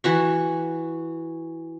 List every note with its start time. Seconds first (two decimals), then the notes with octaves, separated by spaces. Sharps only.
0.04 E3 F#4 C#6